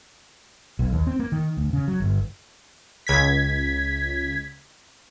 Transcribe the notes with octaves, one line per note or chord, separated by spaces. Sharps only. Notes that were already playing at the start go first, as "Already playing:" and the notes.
B1
D#2
C4
A#3
D#3
D2
C#3
F#3
G1
C#2 G#6 B6